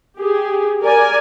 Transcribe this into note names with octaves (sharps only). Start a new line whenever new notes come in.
G4 G#4
A#4 D5 G#5